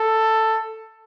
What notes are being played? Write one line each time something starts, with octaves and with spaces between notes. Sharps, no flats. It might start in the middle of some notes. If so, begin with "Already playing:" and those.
Already playing: A4